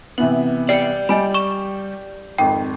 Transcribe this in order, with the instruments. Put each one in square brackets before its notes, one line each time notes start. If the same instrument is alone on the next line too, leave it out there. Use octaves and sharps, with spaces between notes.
[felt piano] C3 E3 B3 [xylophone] F#7
[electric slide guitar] G4 D5 [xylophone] C7 C#7
[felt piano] G3 [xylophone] D#5 G#5 B5
[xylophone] C#6 E7
[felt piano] G#1 F2 [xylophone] G5